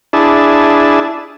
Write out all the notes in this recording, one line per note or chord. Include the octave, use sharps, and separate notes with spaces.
D4 E4 G#4 A5